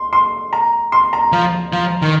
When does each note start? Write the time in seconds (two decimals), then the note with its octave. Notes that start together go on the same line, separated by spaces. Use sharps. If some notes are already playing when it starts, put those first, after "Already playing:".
Already playing: C6
0.13 C6
0.53 A#5
0.92 C6
1.13 A#5
1.32 F3
1.73 F3
2.02 D#3